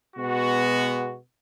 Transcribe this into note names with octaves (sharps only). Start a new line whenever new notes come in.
B2 G#3 B3 F#4